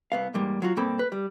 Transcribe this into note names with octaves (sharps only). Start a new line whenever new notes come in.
C2 B3 F5
E2 G#2 G3 A#3
F#3 F4 F#4
G2 B2 A#3 C4 A4 B5
B4
G3